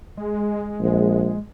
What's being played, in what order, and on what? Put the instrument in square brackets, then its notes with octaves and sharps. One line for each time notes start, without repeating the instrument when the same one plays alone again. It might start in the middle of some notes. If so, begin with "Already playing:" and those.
[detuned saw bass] G#3
[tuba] A#1